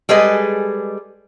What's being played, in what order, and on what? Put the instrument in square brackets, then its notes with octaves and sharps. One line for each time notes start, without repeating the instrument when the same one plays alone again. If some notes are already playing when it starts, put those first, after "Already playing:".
[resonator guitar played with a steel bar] G3 G#3 G#4 A4 B4 D#5